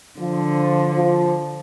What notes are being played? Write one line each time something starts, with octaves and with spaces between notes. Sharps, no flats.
D3 F3
F3